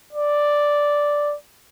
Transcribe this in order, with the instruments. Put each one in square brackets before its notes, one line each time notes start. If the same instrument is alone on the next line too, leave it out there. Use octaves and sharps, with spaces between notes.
[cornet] D5